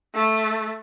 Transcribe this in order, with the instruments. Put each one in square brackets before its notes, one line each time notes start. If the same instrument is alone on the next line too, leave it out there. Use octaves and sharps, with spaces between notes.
[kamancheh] A3